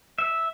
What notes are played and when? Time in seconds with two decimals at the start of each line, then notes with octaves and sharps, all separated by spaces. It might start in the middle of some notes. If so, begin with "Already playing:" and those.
0.18 E5